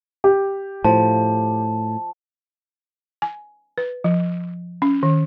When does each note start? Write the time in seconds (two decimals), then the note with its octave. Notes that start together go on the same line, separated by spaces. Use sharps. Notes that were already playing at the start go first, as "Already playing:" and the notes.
0.24 G4
0.84 A2 F3 A5
3.22 G#5
3.78 B4
4.04 F3
4.82 C#4
5.03 D#3